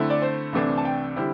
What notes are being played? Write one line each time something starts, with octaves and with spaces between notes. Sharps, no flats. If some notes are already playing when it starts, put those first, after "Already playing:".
Already playing: D3 A3 C4 E4
D5
C5
C2 C3 E3 A3 D4
A5
G5
D3 G3 C4 E4